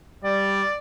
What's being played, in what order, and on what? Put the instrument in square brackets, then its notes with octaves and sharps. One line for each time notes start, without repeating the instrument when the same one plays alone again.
[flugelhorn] G3 [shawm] D5